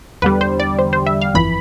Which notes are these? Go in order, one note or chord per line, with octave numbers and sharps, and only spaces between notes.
E2 D3 G3 B4
C5
D5
C5
C5
E5
F5
G1 F2 E3 B5